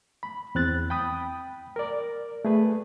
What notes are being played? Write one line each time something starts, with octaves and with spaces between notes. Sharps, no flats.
B5
E2 C4 F#6 A6
G5 B5 D#6
A#4 D5
A3 G#4 B4